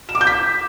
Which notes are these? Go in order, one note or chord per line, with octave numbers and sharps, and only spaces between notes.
E7
D6
G6
B6